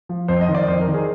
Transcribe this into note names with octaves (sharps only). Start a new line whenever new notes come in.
F3
F2 C5
D#5
D#3
D5
F2 C5
A#4
D#3
G#4